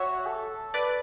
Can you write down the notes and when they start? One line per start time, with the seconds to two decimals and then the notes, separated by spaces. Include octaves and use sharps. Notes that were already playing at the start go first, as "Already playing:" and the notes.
Already playing: F#4 C#5 E5
0.26 A4
0.74 B4 D5